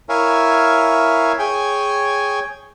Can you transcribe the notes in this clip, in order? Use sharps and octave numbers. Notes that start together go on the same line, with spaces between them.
E4 A#4 C#5 E5 F5 G#5
G#4 C#5 G5 G#5